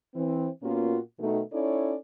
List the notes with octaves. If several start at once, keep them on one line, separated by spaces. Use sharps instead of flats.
E3 C4
A#2 A#3 B3 C#4 F4 F#4
B2 D#3 A3
C#4 D#4 E4 A4 C#5 D5